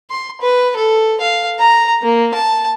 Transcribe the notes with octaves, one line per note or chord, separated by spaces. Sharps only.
C6
B4
A4
F5
A#5
A#3
A5